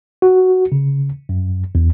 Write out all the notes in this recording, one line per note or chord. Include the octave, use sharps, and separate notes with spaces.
F#4
C#3
F#2
E2